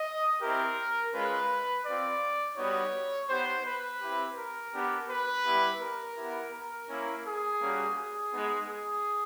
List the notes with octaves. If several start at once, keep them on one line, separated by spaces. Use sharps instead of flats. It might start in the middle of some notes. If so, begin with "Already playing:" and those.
Already playing: D#5
C4 E4 G4 A#4
G#3 C#4 F4 B4
C4 F4 D5
G3 B3 D#4 F#4 C#5
B3 D#4 G4 C5
B4
C4 E4 G4
A#4
B3 D4 G4
B4
G3 B3 E4 G4
A#4
B3 E4 G4
A#4
A#3 C#4 E4
G#4
G3 A#3 C#4 F#4
G#4
G#3 B3 D#4
G#4